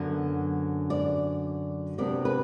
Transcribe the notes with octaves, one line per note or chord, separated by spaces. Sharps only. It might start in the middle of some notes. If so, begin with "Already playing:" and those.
Already playing: F#2 D3 F#3 B3 D4
D5
C3 F#3 B3 D4 D5
B4